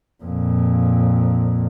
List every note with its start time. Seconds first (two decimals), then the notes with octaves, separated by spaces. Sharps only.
0.24 F2 A#2